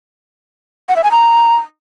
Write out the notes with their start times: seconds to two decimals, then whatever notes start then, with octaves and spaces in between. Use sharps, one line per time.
0.89 F#5
0.96 E5
1.04 G#5
1.11 A#5